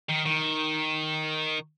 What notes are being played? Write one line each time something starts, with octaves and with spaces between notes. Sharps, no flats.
D#3
D#3